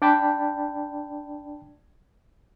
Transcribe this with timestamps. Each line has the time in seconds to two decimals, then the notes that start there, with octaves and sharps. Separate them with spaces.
0.02 D4 D5 G5 A5 B5